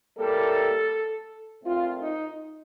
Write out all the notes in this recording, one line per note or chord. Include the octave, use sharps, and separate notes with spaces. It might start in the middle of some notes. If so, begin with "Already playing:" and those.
A2 G3 A#3 A4
A#2 A3 C4 F4
D#4